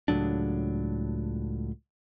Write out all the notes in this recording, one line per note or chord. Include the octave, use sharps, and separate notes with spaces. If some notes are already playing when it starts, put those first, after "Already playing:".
C#2 A2 F#3 D4